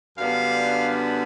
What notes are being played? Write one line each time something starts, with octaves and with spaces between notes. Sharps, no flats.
F#2 D3 G3 B3 D4 F5